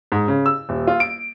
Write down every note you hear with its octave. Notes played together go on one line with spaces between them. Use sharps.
G#2
C#3
E6
D#1
F4
D7